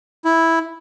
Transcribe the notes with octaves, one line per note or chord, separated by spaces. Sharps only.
E4